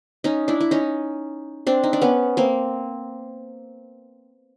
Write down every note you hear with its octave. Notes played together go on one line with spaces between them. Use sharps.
C#4 D#4
D4 E4
E4
C#4 D#4
C4 D4
D#4
D4
B3 C#4
A#3 C4